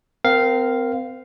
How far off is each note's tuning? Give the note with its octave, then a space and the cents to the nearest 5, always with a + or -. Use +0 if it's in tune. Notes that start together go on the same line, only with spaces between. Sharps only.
C4 -30 A#4 +0 F5 +0